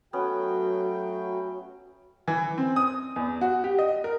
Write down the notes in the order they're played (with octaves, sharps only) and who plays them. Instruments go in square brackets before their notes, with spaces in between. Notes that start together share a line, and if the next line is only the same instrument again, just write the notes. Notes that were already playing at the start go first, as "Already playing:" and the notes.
[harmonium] F#3 A3 G5 [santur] B3 C#4 [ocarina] F#4
[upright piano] E3
C4
D#6
E2
F#4
G4
D#5
A#4